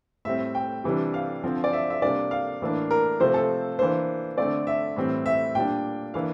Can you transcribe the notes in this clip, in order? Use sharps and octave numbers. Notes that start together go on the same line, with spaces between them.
A2 G3 C4 E5
G5
C3 E3 G3 D4
F5
D3 F3 C4
D5
E5
E5
C3 G3 A#3 D4 D5
F5
A2 E3 A#3 D4
A#4
C3 F3 A3 C4 C5
A4
E3 A#3 D4 C5
D3 A3 C4 D5
E5
A2 E3 G3 C4
E5
A#2 G3 D4 G5
E3 A#3 D4 F5